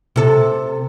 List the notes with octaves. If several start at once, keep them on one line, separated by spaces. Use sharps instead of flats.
C3 A4